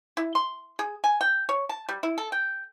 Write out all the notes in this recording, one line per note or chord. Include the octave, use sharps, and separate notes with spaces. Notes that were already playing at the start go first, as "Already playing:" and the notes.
E4
C6
G#4
G#5
G5
C#5
A5
G3
E4
A4
G5